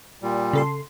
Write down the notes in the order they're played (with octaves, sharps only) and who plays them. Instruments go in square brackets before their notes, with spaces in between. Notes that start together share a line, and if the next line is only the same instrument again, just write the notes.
[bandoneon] A#2 G3
[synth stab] C#3 A4 C6